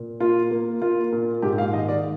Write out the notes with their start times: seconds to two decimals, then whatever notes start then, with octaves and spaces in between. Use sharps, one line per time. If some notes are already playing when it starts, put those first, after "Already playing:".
Already playing: A#2
0.20 A#3 F4
0.51 A#3
0.82 A#3 F4
1.13 A#2
1.42 G#2 G4
1.58 F5
1.73 D#3 D#5
1.88 D5